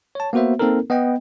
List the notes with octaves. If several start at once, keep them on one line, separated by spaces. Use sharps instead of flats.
C#5 A5
A#3 B3 F#4 C5 E5
A#3 C4 D#4 A4 A#4
B3 D#5 G5